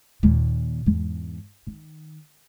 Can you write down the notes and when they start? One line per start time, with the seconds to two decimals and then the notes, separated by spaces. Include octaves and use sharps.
0.23 D#2 A#2
0.86 E2 G#2
1.67 D#3